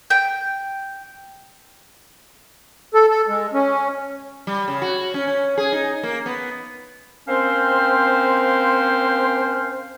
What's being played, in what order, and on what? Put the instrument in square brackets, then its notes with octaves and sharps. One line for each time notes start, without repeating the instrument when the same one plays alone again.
[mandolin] G5
[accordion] A4
A4
G#3
C#4
[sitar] G3
C#3
F#4
C#4
C#4
G#4
D#4
A#3
B3
[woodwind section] A#3 C4 C#4 C5